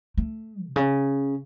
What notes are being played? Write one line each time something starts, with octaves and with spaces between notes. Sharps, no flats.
A3
B2
C#3